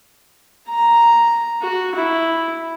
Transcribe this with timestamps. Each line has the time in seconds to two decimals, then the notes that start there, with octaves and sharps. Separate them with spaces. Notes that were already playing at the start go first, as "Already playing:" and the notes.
0.69 A#5
1.62 F#4
1.95 E4